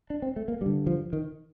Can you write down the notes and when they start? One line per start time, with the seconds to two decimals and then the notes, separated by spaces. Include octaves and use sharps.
0.10 D4
0.22 C4
0.36 A3
0.48 A#3
0.61 G2 G3
0.66 D3
0.87 F3
1.13 D#3